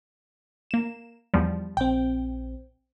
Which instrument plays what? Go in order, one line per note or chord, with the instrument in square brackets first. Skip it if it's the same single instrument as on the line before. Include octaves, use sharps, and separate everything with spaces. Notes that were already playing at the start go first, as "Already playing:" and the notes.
[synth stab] A#3 E7
E2 F3 G3
[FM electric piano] A#1 C4 [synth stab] G5